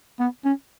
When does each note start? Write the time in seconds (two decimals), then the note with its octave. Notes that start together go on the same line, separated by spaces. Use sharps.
0.20 B3
0.45 C#4